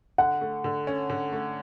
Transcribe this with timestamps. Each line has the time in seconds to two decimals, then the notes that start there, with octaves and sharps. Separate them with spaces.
0.18 D3 F#5
0.41 A3
0.64 D3
0.87 C#4
1.10 D3
1.32 A3